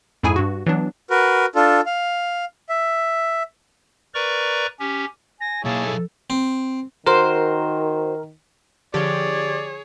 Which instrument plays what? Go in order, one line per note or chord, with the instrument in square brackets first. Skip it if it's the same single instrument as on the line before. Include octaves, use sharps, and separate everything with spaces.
[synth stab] F2 G#2 E4 G#4 G#5
G2 F#4
E3 F#3 B3 D4
[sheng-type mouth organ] F#4 A#4 B4
D4 F4 A4
F5
E5
[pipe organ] A#4 B4 D5 A#5 C#6
C#4 G4
[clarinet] G#5 [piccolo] A#6
[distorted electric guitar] B1 F5 [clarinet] A#3 [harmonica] E4 G#4 C#5 [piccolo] A5
[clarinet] A4
[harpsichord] C4
[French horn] D#3 [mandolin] F#4 C5 [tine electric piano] A#4
[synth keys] D3 F3 G4 [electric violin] G#4 C#5 [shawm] D5